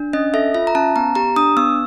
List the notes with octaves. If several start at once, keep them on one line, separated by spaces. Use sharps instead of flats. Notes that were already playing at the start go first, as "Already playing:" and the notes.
Already playing: D4
C#4 D#5
A4 E5
F4 E5
A#5
C#4 A5
B3 A#5
G4 A#5
D4 D#6
B3 E6